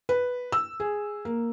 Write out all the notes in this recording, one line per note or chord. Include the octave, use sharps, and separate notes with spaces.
B4
E6
G#4
A#3